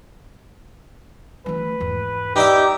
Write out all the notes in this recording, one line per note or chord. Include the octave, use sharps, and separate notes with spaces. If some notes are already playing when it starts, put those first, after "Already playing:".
E3 A3 B4
E2 G#2
D#4 G4 D5 E5